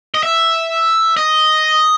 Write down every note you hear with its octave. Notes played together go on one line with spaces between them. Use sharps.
D#5
E5
D#5